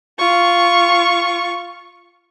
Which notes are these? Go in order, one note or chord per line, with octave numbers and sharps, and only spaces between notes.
F4 C#6